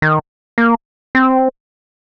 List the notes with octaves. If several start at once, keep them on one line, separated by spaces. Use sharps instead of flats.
D#3
A#3
C4